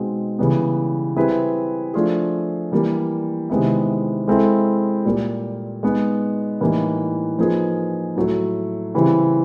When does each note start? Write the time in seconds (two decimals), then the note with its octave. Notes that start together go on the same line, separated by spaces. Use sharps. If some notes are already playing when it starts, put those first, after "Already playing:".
Already playing: B2 G#3 C4 D#4
0.39 C#3 E3 G3 B3
1.16 G3 C4 E4 G#4 B4
1.94 F3 A3 D4 F4 G#4
2.72 E3 G3 A#3
3.50 C3 D#3 G#3 B3 E4
4.28 G#3 C4 E4 A4
5.05 A#2 G3 A#3
5.83 G#3 B3 D#4
6.61 A2 E3 G3 A#3 D#4
7.38 F3 A#3 D#4 G#4 B4
8.16 A2 F#3 A3
8.94 C#3 E3 G3 C4 E4